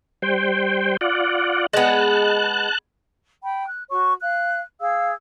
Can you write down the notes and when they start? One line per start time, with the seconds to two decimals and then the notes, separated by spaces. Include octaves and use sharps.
0.22 G3 C5 G5
1.01 F4 D5 F#5
1.73 G#3 B3 A5 F#6
3.43 G5 B5
3.66 F#6
3.90 F#4 C#5 C#6
4.21 F5 F#6
4.80 G#4 F5 E6